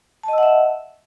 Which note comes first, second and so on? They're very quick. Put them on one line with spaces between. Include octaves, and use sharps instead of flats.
A5 D#5 E6 F#5 E5